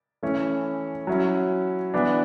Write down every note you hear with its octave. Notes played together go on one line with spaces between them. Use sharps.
E3 A3 C#4 E4
F#3 C#4 E4
E3 B3 D4